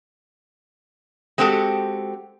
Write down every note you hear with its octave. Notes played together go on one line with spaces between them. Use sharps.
G#3 C4 F#4 G4 A4